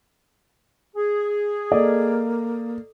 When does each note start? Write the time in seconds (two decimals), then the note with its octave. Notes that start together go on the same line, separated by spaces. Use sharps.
0.96 G#4
1.72 A#3 A4 D5 D#5